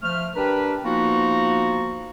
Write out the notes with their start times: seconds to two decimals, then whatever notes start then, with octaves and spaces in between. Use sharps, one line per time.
0.02 F3 A3 F6
0.35 D4 G4 A#4 B4
0.84 F3 A#3 B3 D#4 F4 F#4